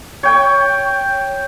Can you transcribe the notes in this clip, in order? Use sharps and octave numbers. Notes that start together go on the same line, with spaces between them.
C#5 G5